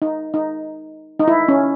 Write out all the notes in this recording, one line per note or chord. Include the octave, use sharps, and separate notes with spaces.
D#4
D#4
D#4
E4
C#4